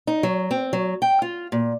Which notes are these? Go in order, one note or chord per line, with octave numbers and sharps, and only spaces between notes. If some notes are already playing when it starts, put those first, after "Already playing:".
D#4
F#3
C4
F#3
G5
F4
A#2